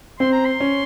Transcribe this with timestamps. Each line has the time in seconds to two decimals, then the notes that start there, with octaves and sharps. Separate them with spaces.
0.19 C4 C6
0.32 A#5
0.45 C6
0.60 C#4